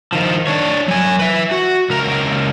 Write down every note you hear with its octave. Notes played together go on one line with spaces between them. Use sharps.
D#3 F3
D4 C#5
F#3 G#5
B4 E5
F#4
C#2 A#4